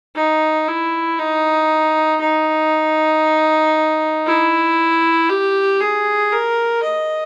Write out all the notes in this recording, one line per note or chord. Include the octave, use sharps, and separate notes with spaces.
D#4
E4
D#4
D#4
E4
G4
G#4
A#4
D#5